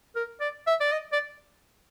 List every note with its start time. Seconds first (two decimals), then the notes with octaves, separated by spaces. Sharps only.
0.16 A#4
0.41 D5
0.67 E5
0.81 D5
0.92 D#5
1.12 D5